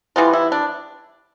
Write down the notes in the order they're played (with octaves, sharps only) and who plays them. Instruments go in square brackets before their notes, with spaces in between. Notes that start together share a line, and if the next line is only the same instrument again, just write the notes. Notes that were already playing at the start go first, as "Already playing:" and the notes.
[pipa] E3 G3 B3 F4
E4
D4